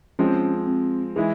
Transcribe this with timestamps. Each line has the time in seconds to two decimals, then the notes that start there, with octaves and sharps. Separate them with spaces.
0.19 F3 G#3 C4 C#4
0.67 C4
1.16 E3 G#3 E4 G#4